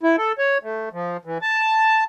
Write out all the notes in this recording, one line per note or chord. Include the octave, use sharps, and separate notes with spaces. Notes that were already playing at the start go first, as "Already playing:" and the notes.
E4
A4
C#5
A3
F3
E3
A5